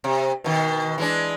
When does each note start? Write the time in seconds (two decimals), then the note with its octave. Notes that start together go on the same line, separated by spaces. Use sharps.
0.04 C3
0.44 B2 D#3
0.98 E3 G#3 D4